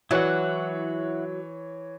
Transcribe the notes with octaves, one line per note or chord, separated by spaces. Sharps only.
E3 F#3 E4 C#5 F#5